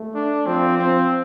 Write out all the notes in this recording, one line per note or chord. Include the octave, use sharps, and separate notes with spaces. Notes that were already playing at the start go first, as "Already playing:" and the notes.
Already playing: A3
D4
F3 C4
C4